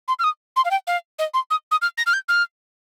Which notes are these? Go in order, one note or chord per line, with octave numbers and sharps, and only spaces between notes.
C6
F6
D#6
C6
F5
G5
F5
D#5
C6
D#6
D#6
F6
A#6
F6
G6
F6